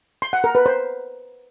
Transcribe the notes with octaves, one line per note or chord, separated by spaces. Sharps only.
C6
F#5
A#4
B4
C5